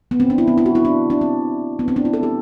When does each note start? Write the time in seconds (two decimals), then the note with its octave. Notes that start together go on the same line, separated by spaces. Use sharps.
0.11 B3
0.20 C4
0.30 D4
0.38 E4
0.48 B3
0.58 E4
0.66 F#4
0.75 E4
0.85 D4
1.10 D4
1.21 C4
1.79 B3
1.88 C4
1.96 D4
2.05 E4
2.13 A4
2.23 G4